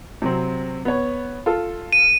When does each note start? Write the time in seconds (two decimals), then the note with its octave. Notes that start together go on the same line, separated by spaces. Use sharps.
0.22 C3 F#3 C4
0.85 B3 C#5
1.46 F4 A4
1.93 D#7